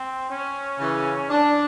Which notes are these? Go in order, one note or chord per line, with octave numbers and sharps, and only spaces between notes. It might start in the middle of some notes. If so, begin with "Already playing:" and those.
Already playing: C4
C#4
C#3 E3
D4